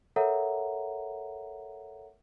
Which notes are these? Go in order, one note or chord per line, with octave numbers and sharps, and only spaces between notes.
A4 A#4 C#5 E5 F#5 A#5